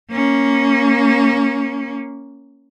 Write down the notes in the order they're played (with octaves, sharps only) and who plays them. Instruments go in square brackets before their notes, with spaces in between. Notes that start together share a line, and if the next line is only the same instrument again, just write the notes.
[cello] A#3 C#4